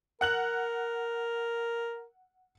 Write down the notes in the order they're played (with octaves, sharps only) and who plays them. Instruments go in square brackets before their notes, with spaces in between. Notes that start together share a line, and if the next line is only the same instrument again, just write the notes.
[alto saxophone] A#4 [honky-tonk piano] F#5 F#6 F#7